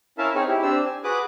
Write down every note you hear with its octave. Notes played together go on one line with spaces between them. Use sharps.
C#4 E4 A#4 E5 F5 A5
C4 D#4 G#4 C#5 G#5
E4 G4
C4 D4 G4 C5 E6
G#5
F#4 G#4 B4 D6 D#6 F#6